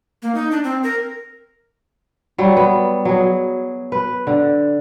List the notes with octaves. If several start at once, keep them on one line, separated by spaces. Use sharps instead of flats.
A#3
D#4
D4
C4
A#4
F#3 G3
B3
F#3 G#4
B4
D3